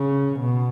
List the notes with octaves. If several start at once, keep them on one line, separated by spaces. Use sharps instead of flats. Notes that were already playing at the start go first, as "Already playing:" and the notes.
Already playing: C#3
B2